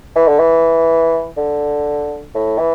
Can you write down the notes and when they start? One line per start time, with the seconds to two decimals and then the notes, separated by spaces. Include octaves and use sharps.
0.16 E3
0.28 D3
0.39 E3
1.37 D3
2.35 A2
2.59 E3